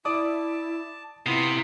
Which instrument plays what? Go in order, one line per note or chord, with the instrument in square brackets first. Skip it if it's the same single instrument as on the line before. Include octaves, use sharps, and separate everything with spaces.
[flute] E4 [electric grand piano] D5 D6 D#6 [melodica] A5
[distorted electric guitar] C3 [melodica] B3 F4 D#6 [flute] E4